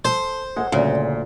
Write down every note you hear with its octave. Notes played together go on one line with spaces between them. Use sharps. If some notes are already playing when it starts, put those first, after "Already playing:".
A4 C5
G#3 A4 C#5 F#5
D2 A#2 C#3